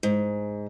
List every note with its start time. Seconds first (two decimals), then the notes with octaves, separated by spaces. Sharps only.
0.03 G#2